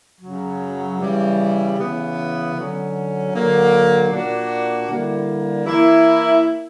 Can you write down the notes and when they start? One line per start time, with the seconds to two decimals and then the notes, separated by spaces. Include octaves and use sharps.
0.21 F#2 C#3 F#3
0.99 C#3 E3 G3
1.77 C#3 E3 B3
2.55 D3 F#3 C#4
3.33 D3 F#3 A#3
4.11 A#2 A#3 D4 F#4
4.88 D3 G3 A#3 E4
5.66 E3 A#3 E4